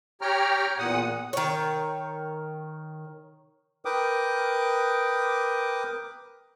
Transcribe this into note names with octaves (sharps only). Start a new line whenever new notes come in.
G4 C#5 G5 A#5 F6
E2 A#2 F#5 D#6
D#3 C#5
A#4 B4 G5 D6 D#6